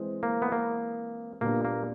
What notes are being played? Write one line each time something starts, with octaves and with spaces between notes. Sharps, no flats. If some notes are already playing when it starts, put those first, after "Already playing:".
Already playing: E3 G#3 C4
A#3
B3
A#3
A#2 G3 A#3 B3 D4 F4
A#3